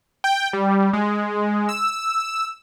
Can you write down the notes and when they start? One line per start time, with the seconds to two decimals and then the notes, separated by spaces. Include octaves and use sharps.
0.24 G5
0.53 G3
0.93 G#3
1.69 E6